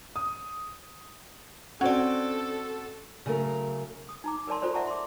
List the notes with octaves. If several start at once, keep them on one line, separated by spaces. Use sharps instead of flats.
D#6
C4 C#4 F#4 A4 D5 F#5
C#3 F#3 A3 A#4
D#6
D#4 A#5 D6
A#4 B4 D5 A5 C6
F4 A4 B4 C5 D5
D5 E5 F#5 A5 A#5 C#6
C6 D6